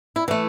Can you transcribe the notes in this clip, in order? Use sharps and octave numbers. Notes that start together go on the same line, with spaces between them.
E4
E3 A3